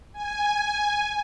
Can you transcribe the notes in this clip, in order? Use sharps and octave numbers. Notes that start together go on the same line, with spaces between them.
G#5